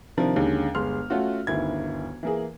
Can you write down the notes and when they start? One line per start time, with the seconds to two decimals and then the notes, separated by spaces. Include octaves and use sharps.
0.17 C3 D#3 F3 D4 A#4
0.36 D#2 D3 G#3 C#4
0.75 G1 G#3 C6 F6
1.10 A3 C#4 F4 F#4
1.47 G1 D2 D#3 E4 G#6
2.23 E3 A#3 G#4